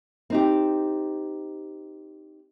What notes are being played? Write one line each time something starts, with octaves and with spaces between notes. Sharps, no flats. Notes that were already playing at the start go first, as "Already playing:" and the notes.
C4 D#4 G4